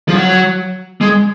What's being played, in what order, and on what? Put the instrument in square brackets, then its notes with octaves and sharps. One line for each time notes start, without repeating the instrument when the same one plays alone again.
[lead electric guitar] F3
F#3
G#3